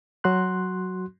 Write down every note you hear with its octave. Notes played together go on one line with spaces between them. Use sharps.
F#3 F#4 C6 F#6